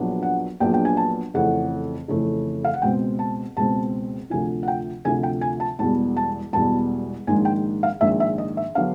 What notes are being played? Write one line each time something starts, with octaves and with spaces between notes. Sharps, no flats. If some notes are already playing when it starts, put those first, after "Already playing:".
Already playing: A#1 A#2 F#3 B3 D4
F#5
A#1 A#2 F#3 B3 D4 G5
G5
G#5
A5
F2 C#3 E3 A3 F#5
F2 C#3 E3 A3
F5
F#5
C#2 B2 G#3 C4 G5
A5
C#2 B2 G#3 C4 A5
D2 C3 F3 G#5
F#5
G5
D2 C3 F3 G#5
G5
G#5
A5
E1 E2 B2 G3 A5
A5
E1 E2 B2 G3 A5
A#1 G#2 D#3 G#3 G#5
G5
F5
A#1 G#2 D#3 G#3 E5
E5
D#5
E5
D3 F#3 B3 D4 F5